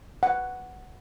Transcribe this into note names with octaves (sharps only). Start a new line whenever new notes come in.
F#5